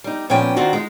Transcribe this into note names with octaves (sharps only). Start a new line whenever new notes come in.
G3 D#4
A#2 F3 B3 C#4 G5
D#3 C4 D4 F4 F#4 C5
G#3 D#4